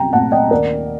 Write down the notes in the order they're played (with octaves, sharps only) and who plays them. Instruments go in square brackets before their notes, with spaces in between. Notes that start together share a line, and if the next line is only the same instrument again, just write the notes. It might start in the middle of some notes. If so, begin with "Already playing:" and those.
Already playing: [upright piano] C2 G5 A#5
A#2 A3 C4 F#5 A5
D#5 G5
D#2 A#4 D5